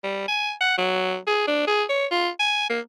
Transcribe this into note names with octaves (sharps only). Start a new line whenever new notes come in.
G3
G#5
F#5
F#3
G#4
D4
G#4
C#5
F4
G#5
A#3